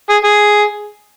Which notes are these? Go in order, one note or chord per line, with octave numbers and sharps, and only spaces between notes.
G#4
G#4